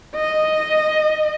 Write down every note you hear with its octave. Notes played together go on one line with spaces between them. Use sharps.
D#5